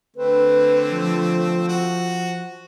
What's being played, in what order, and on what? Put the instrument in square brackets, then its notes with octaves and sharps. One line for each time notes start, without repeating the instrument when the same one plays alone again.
[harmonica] D3 A3 C4 [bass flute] B4
[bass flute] F3
[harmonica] F#4